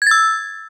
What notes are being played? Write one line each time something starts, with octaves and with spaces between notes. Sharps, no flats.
E6 G#6 A6